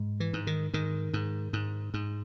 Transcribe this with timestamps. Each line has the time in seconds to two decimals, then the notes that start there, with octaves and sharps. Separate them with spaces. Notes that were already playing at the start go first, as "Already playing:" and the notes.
Already playing: G#2
0.20 E3
0.33 G#2
0.47 D#3
0.74 G#2 D#3
1.14 G#2
1.53 G#2
1.94 G#2